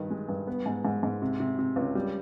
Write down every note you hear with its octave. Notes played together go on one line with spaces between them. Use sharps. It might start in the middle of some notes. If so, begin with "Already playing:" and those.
Already playing: G2 D#3
G#3
G2
B3
G#2
G#2
G#2
C3
C3
C3
C#2
G3